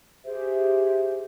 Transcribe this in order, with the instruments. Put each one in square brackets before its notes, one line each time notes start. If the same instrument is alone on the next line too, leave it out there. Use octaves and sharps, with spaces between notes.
[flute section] G4 G#4 C5 E5